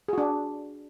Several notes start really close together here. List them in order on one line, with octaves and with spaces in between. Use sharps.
G#4 F#4 D4